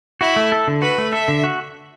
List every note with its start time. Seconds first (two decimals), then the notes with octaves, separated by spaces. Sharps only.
0.21 E4 F#4
0.36 A3
0.52 A4
0.68 D3
0.82 F#4 B4
0.98 A3
1.12 A4 E5
1.28 D3
1.44 F#4